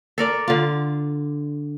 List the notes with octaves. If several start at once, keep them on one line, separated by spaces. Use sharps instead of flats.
A4 A#4 D5
D3 F4